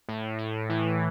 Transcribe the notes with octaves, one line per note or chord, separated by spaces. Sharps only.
A2
A2
E3